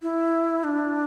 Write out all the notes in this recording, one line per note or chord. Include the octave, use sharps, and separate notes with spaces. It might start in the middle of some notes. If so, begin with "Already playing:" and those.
E4
D4